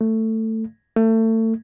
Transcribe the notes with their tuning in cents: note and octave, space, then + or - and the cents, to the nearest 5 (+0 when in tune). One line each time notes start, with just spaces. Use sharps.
A3 +15
A3 +30